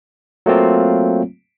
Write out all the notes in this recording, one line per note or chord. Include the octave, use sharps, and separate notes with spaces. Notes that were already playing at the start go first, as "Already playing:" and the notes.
F#3 A3 A#3 C4 F4